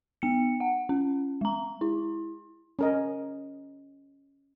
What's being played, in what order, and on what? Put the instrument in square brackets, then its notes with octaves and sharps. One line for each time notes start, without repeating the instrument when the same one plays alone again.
[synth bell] B3 C#7
F#5
C#4
G#3 A#5
E4
[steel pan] C#4 A#4 D#5